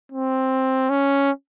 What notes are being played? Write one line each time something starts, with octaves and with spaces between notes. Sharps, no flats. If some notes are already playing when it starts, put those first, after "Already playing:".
C4
C#4